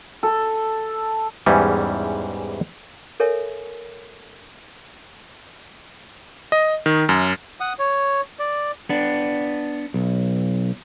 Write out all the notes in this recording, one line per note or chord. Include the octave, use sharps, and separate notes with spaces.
A4
E2 G#2 E3 G3 C#4
A4 A#4 C#5 E5 G#5
D#5
D#3
F#2
F#5 D#6
C#5
D5
B3 D4
B1